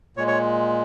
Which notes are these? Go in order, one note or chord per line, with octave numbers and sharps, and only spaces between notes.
A#2 G#3 C#5
C#5